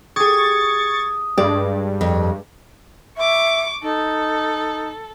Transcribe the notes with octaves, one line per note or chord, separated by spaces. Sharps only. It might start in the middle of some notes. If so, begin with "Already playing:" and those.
G4 G#4 C#6 D#6 G#6 A6
G2 G#3 D5
F2
E5 C#6 D6
D#4 A4